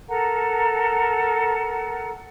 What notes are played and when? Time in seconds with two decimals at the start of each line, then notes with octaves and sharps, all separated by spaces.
0.08 A4 A#4 F#5 A#5